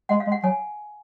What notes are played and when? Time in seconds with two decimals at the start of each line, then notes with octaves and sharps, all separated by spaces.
0.09 G#3 F#5
0.20 F5
0.27 G#3
0.32 F#5
0.44 F#3 G#5